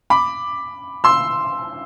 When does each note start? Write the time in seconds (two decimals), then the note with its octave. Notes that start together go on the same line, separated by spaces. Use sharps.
0.10 B5 D6
1.04 C6 E6